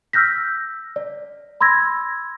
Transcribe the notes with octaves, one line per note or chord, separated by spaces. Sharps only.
E6 F6 G6 A#6 B6
D5
B5 C6 E6 G#6 A#6